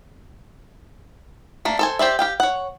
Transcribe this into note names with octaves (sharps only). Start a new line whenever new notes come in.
A3 A#3 D4
A4 C5 G#5
G4 C5 D5 E5
G4 F5 G5
C#5 F#5